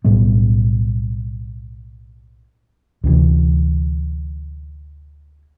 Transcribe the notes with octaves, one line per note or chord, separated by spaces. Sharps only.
B1 A2 G3 B3
D2 C3 E3